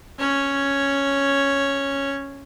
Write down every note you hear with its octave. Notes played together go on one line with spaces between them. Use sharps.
C#4 C#5